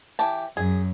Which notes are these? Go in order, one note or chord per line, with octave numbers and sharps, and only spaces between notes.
E3 G4 A5
F#2 G#4